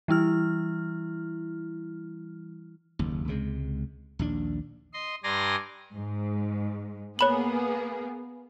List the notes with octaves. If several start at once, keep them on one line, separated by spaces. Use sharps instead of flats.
E3 G3 E4 F6
F#1 D#2
C#2 C3 G#3
A#1 D#2 D4
D#5 C6
G2 D5 G#5 A#5 C6 A#6
G#2
A#3 B3 G#4 C#5 B5 F#7